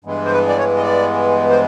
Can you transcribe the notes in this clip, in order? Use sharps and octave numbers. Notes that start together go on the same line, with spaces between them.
G2 E3 G#3 B3
C5
B4
D5
C#5
D#5
D5
C5